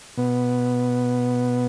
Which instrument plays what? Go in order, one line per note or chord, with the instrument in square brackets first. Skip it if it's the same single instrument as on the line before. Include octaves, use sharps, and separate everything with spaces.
[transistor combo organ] B2 B3